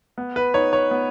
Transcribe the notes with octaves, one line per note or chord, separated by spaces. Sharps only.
B3
B4
D#4 C#5
C#5
B3